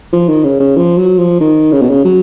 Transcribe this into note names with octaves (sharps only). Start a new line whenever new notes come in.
F3
D#3
C#3
C#3
F3
F#3
F3
D#3
C#3
B2
C#3
F#3